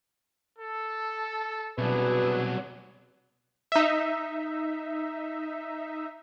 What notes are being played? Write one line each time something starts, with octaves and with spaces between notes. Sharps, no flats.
A4
C2 B2 F#3 D4 G#4 B4
D#4 E5